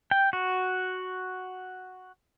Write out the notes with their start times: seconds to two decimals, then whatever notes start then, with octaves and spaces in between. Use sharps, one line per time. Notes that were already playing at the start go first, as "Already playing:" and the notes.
0.11 G5
0.33 F#4